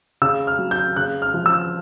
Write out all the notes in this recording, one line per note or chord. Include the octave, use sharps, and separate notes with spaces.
C#3 E6
F6
F#3
G6
C#3 F#6
F6
F3
E6